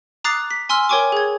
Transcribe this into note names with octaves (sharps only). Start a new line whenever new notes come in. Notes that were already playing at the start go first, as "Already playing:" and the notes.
A#5 D6 D#6 F#6 A6 C7
B6
G#5 C6 E6 F6
A#4 C#5 G5 G#5 C#6 D6
G#4 G#6